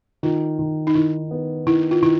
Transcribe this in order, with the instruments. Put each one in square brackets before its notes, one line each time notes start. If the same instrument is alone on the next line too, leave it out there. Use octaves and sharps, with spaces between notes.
[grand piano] D#3 [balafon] F4
[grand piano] D#3
[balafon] D#4
[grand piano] D#3 [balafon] E4
[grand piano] B3
[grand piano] D#3 [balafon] E4
[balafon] F4
[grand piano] D#3 [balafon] E4